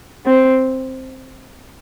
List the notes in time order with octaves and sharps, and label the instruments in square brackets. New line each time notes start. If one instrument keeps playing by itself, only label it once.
[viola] C4